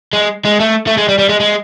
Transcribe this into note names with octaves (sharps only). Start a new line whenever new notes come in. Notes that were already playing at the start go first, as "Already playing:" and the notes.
G#3
G#3
A3
A3
G#3
G3
G3
G#3
G#3